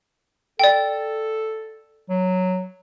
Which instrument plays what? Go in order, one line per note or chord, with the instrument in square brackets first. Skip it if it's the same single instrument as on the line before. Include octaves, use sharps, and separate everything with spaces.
[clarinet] A4 [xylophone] D5 G5
[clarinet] F#3